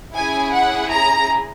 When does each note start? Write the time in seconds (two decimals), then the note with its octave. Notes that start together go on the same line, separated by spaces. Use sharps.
0.15 C#4 E4 G#4 G#5
0.52 F#5
0.90 A#5